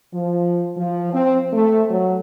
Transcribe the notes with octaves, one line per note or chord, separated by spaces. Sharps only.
F3
F3
C4
A3
F#3